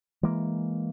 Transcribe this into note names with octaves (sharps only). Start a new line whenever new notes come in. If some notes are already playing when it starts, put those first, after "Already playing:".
E3 G#3 A#3